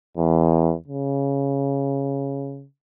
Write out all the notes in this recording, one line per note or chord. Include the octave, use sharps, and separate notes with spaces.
E2
C#3